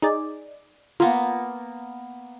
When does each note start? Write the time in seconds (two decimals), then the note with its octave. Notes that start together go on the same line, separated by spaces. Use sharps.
0.02 D#4 G#4 D5
1.00 A#3 B3 F4